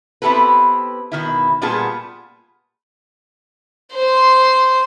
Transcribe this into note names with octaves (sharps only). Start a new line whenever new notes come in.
B3 C4 E4 G4 A4 B4
B2 D#3 E4
A#2 G3 B3 F4 G#4 A5
C5 C6